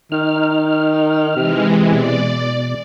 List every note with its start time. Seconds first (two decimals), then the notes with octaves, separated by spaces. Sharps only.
0.12 D#3 D#4 F6
1.36 C3 E3 G#3
1.92 B2 D5